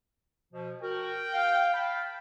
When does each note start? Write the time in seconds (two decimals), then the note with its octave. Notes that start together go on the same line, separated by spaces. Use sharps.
0.53 B2 F3
0.82 F#4 A#4 G5
1.34 F5
1.74 F5 A5 B5